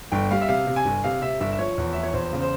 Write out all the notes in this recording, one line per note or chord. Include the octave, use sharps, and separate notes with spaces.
G1 G5
G3 F5
E5
C3 F5
C3
G#5
G1
C3 F5
C3 E5
G1 E5
E5
F3 C#5
E2
F3 E5
C#5
E2 C5
C#3
C5